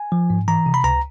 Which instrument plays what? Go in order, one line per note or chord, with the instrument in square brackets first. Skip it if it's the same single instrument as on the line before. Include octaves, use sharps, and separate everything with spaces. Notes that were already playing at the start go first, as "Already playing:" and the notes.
Already playing: [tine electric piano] G#5
F3
G#2
E3 A#5
C3
B5
C#2 A#5